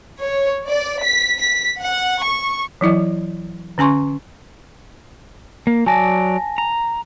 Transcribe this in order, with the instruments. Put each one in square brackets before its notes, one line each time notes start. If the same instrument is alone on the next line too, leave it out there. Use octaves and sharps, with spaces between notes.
[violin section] C#5
D5
B6
B6
F#5
C#6
[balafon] E3 F#3 E4 D#5
D3 C#4 G#5 C6 C#6
[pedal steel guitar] A#3
[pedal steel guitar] F#3 D5 [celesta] G#5 A5 A#6
[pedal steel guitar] A#5